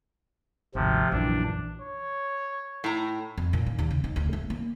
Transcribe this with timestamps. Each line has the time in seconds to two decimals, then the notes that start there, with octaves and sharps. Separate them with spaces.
0.75 G#1 D2 C3 F3
1.12 A#1 F#2 E3 D4
1.82 C#5
2.84 A2 A#5
3.38 F2
3.53 A#2
3.66 D#3
3.79 D#2
3.90 C#3
4.04 D#4
4.16 D2
4.33 A3
4.50 A#3